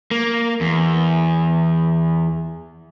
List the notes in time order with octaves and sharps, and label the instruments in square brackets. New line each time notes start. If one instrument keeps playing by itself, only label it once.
[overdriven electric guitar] A#3
E2